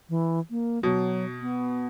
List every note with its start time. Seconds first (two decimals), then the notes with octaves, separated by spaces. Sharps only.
0.09 E3
0.50 A#3
0.83 B2 F#3
1.41 B3